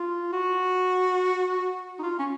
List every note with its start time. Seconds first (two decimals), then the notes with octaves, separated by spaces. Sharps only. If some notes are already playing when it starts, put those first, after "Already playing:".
Already playing: F4
0.33 F#4
1.99 D#4
2.03 F4
2.19 C#4